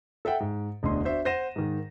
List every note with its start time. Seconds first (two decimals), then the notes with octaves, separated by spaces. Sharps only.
0.25 A4 E5 F#5 G5
0.40 G#2
0.83 E1 D2 D3 D#5 C6
1.04 D4 F#4 C5 E5
1.25 C5 F#5 A#6 D#7 E7
1.56 G#2 D#3